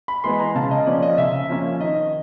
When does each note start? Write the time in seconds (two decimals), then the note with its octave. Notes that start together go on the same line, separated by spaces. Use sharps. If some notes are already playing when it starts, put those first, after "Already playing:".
0.08 B5
0.24 E3 G#3 B3 C6
0.39 A#5
0.55 C#3 A5
0.71 D#5
0.86 F3 A#3 C#4 D5
1.02 D#5
1.18 C#3 E5
1.49 F3 A#3 C#4
1.80 D#3 D#5